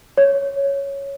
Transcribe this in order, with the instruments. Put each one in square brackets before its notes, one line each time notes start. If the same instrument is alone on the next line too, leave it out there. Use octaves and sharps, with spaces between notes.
[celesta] C#5